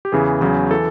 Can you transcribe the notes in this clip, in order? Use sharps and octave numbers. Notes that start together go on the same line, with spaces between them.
G4
E2 C#3 E3 G#4
E2 C#3 F#3
E3 A4